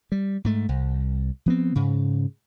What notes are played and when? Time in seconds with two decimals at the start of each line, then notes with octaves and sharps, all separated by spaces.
0.12 G3
0.44 G#2 A3
0.69 C2
1.46 F3 B3 C4
1.75 G#2 C#3